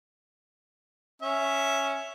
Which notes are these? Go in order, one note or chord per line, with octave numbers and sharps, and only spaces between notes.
C#4 E5